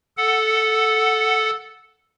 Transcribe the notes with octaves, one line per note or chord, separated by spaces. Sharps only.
A4 F#5